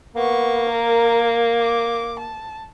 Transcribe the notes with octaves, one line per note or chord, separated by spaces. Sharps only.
A#3 B3 C#6
A#4
D6
A5